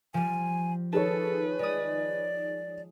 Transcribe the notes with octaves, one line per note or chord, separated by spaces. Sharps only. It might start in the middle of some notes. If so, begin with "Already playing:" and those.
F3 G3 G#5
D#3 G#4 A4 B4 C#5 A5
G#3 D5 D#6